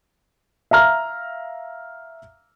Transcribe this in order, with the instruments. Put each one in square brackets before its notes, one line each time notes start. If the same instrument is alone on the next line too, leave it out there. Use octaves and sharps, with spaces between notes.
[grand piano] E5 F5 A#5 F6